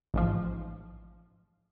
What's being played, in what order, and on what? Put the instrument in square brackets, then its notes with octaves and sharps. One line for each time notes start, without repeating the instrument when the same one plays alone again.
[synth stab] A1 G#2 F3